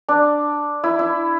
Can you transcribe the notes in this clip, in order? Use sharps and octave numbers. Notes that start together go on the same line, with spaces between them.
D4
E4
E4